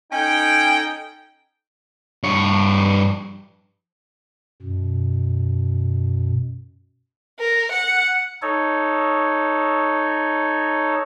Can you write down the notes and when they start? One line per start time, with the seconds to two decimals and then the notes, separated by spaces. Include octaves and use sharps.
0.12 C#4 D#4 A4 G5
2.23 G2 C#5
4.62 F#2 B2
7.40 A#4
7.72 F#5
8.42 D#4 A4 C#5